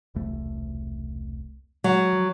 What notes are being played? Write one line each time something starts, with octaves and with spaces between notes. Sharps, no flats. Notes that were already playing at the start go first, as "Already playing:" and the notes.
E1 C2 A3
F#3 G#3
F3